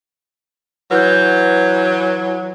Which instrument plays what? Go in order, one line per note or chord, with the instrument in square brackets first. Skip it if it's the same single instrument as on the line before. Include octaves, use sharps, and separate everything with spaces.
[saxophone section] E3 F#3 [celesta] B4 G6